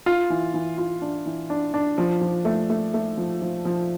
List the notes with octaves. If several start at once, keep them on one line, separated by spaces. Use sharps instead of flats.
F4
E3
E3
F4
D4
E3
D4
D4
F3
F3
A3
A3
A3
F3
F3
F3